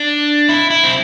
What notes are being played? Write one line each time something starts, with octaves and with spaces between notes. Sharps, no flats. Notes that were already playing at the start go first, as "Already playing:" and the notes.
Already playing: D4
E4
E4
C4